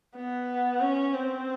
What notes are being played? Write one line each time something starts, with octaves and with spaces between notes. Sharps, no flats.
B3
C#4
C4